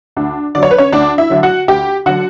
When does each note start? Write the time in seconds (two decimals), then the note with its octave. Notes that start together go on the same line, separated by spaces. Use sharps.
0.17 D2 D4
0.55 D3 F#3 D5
0.63 C#5
0.71 B4
0.78 C#4 C#5
0.93 D2 D4 D5
1.18 E4 E5
1.30 D3 F#3
1.43 F#4 F#5
1.68 D2 G4 G5
2.06 D3 F#3 F#4 F#5